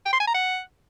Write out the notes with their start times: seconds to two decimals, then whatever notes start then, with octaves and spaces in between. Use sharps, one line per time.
0.05 G5
0.13 C6
0.20 G#5
0.27 A#5
0.34 F#5